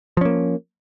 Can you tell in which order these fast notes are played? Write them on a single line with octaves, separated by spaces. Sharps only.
F3 C#4 A#3